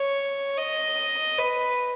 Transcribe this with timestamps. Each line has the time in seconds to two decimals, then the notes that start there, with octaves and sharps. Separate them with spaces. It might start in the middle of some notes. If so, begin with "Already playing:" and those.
Already playing: C#5
0.58 D#5
1.38 B4